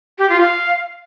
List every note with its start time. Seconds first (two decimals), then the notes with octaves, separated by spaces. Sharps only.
0.18 G4
0.30 F4
0.41 F5